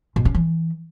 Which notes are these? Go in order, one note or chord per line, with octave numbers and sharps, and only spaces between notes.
B2
C#4
E3